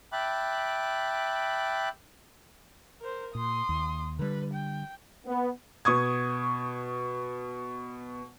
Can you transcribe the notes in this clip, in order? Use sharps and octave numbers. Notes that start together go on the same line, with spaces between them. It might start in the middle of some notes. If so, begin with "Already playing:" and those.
E5 G5 A5 B5 D6 F#6
A#4 C5
A#2 C6 D#6
D#2
D3 G3 B4
G5
B3
B2 C#6 D#6 G#6